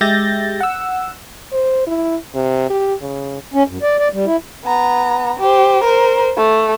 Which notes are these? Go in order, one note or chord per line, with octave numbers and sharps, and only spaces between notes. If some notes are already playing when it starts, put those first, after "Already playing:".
G#3 G4 E5 G6 A6 A#6
F#5 E6
C5
E4
C3
G4
C#3
C#4
F#2
D5
D5
G3
E4
B3 A#5
G4 C5
A#4 C5
A3